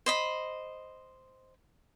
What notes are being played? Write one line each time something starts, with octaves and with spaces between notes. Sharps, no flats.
C5 D#5 B5